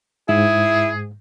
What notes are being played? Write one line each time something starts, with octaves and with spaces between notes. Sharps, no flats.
G#2 E4 G#4